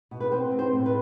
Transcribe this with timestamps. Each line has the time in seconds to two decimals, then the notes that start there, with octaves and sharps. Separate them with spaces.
0.11 B2
0.20 B4
0.31 C4 C5
0.51 C4
0.59 C5
0.72 A2
0.86 B4